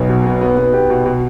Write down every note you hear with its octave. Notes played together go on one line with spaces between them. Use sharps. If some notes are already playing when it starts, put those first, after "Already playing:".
Already playing: B1 B3
B2
B3
B3
B3
G4
B2
B2